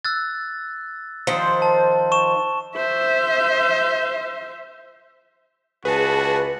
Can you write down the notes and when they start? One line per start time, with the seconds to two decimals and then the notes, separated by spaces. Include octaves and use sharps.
0.05 E6 F#6 A6
1.27 D#3 F3 C5
1.62 A5
2.12 C#6 E7
2.75 C5 E5
5.85 C#2 F#4 G#4 B4 A5